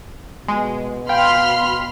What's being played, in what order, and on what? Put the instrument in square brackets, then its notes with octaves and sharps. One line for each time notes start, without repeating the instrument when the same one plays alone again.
[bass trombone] B2 [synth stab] G#3
[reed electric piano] F5 [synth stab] G5 [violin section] B5 C6 F6